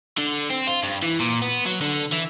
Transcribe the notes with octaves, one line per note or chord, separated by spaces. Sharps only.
D3
C4
F4
G2
E3
A#2
B3
F#3
D3
E3